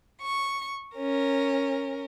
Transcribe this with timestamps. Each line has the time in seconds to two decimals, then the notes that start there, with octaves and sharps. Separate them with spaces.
0.22 C#6
0.96 C#4 A#4